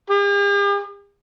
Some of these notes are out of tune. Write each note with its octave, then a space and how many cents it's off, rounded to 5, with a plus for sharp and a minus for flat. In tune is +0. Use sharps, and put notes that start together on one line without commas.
G4 +45